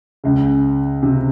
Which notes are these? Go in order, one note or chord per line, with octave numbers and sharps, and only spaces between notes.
C#2 C#3
C3